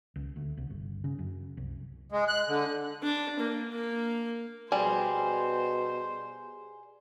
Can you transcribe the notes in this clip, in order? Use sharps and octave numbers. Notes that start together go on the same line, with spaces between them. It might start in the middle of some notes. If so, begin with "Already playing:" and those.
C#2
D2
C2
G1
C#3
F#2
C2
G#3
F#6
D3
D4
A#3
A#3
B2 G3 G#4 C5 D5 G#5